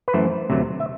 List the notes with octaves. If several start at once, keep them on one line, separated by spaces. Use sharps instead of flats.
B4
F#2 E3 A3 C5
D2 C3 F#3 A3
E5